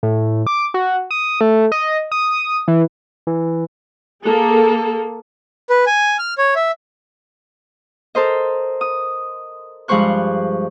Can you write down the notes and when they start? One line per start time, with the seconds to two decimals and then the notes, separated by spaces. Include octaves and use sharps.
0.03 A2
0.47 D6
0.74 F#4
1.11 D#6
1.41 A3
1.72 D#5
2.12 D#6
2.68 E3
3.27 E3
4.24 A#3 G#4 A4
5.70 B4
5.87 G#5
6.19 F6
6.38 C#5
6.56 E5
8.15 A4 A#4 C5 D#5
8.81 D#6
9.88 G2 F3 G#3 C5 C#6 F#6